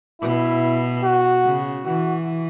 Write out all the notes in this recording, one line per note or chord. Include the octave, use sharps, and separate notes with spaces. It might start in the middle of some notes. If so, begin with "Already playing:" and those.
B2 E4
F#4
C#3
E3 F#4